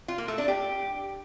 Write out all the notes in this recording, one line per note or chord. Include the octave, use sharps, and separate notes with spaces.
F4
A#3
A3
D4
G4